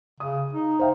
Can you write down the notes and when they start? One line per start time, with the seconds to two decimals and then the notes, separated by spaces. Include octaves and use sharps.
0.20 C#3 D#6
0.53 D#4
0.79 C5 F5 G5